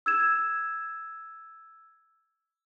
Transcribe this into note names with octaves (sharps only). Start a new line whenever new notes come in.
E6 G#6 E7